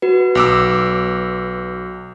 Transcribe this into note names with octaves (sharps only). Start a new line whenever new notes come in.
F#4 B4
B1 D6 E6